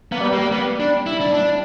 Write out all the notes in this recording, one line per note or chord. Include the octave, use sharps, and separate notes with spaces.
A#3 B3
G3
G3 A#3
B3
D4
E4
D4
D4